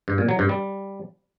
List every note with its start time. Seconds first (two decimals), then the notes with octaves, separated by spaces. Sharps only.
0.08 G2
0.18 A#2
0.29 F#3
0.39 G2
0.49 G3